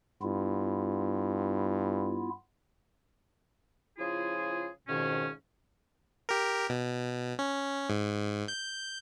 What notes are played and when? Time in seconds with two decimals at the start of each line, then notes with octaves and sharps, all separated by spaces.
0.22 G2 B3 E4 F4
3.99 C#3 F3 E4 F4 G#4
4.88 F2 G#2 B2 D#3 C#4
6.29 G4 A#4
6.69 B2
7.39 C#4
7.89 G#2
8.48 G6